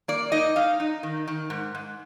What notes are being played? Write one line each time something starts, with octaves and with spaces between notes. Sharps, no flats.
A#3 D5
D#4 D#5
D#4 F5
D#4
D#3
D#3
G#2
G#2